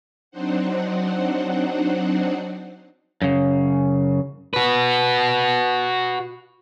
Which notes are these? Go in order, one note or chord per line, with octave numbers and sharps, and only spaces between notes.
F#3 C4 D4 D#4 C5 F#5
F#2 C#3
F#4 B4